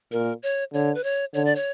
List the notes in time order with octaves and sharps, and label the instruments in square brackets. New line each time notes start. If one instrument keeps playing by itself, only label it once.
[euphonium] A#2 [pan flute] A#4
[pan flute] C#5
[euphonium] D3 [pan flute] C#5
[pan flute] B4
C#5
[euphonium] D3 [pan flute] C#5
[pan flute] D5
C#5